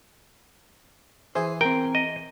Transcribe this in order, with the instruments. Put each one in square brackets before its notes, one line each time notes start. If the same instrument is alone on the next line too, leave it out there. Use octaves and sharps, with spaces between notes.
[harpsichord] E3 G#4 [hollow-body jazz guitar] C5
[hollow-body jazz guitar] C4 A#4 [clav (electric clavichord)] G5
[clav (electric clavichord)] D#5